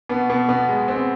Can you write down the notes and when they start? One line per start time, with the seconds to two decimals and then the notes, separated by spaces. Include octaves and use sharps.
0.09 B2 B3
0.30 B2
0.49 B2 B3
0.69 G#3
0.88 B3 C4